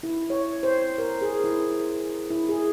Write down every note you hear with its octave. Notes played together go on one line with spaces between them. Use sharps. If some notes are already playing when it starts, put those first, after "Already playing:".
E4
C#5
C5
A#4
G#4
E4
E4
G#4